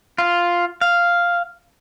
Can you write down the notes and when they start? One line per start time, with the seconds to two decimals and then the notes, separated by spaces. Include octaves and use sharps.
0.18 F4
0.81 F5